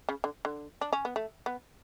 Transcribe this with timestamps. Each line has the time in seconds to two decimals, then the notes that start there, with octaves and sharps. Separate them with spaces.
0.09 C#3
0.24 D3
0.45 D3
0.81 D4
0.93 C#4
1.05 B3
1.16 A3
1.46 B3